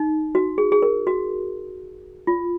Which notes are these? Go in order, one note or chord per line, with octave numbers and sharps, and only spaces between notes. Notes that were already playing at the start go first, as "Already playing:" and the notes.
Already playing: D#4
F#4
G#4
G#4
A#4
F#4
F4